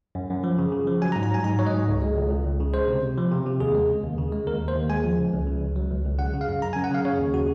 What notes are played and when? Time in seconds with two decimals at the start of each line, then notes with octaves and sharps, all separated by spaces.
0.15 F#2
0.30 F#2
0.44 F3
0.58 C#3
0.72 C#3
0.87 F3
1.02 F#3 G#5
1.12 A#5
1.16 G#2
1.23 A#5
1.31 F#3 G#5
1.44 G#2 A#5
1.59 F#3 C#5
1.67 D#5
1.74 G#2
1.88 C#2
2.02 G#3
2.17 C#2
2.31 C#2
2.46 C#2
2.60 C#3
2.74 G#3 C5
2.88 C3
3.03 C3
3.18 F3
3.32 C3
3.46 C3
3.60 D#2 G#4
3.75 G#3
3.90 C#3
4.04 D#2
4.18 C#3
4.32 G#3
4.47 D#2 A#4
4.62 D#2
4.68 C5
4.75 D#2
4.90 G#3 G#5
5.04 F3
5.19 C#3
5.33 C#2
5.47 C#3
5.61 C#2
5.76 F#3
5.90 C#2
6.05 C#2
6.18 C#3 F#5
6.33 C#3
6.41 F5
6.48 F#2
6.62 F#2 A#5
6.73 G#5
6.76 F#2
6.84 F#5
6.91 C#3 F5
7.05 C#3 C#5
7.20 D#2
7.34 C#3 F#4